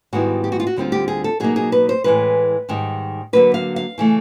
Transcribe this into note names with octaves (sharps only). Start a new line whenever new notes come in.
G#2 D#3 G3 B3 E4 F#4
G4
F#4
F4
F#4
D2 D3 G3 C4 F4
G4
G#4
A4
B2 F#3 A#3 D#4 G#4
G#4
B4
C5
A2 E3 G#3 B4
G#2 D#3 G3
D3 F#3 A#3 B4
F5
F5
C#3 E3 A3